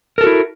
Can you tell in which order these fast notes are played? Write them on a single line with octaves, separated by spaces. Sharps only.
A#4 A4 F#4 E4